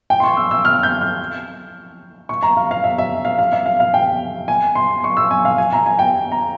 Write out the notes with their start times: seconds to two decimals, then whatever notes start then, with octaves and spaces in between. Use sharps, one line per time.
0.10 G5
0.20 C6
0.24 C#6
0.37 E6
0.51 E6
0.65 F6
0.83 G6
1.01 F6
2.29 C#6
2.43 A#5
2.57 F5
2.71 F5
2.84 E5
2.98 E5
3.25 F5
3.38 F5
3.52 E5
3.66 F5
3.80 F5
3.94 G5
4.48 G#5
4.75 C6
5.04 C#6
5.17 E6
5.31 G#5
5.45 F5
5.58 G#5
5.73 A#5
5.86 G#5
5.99 G5
6.32 A#5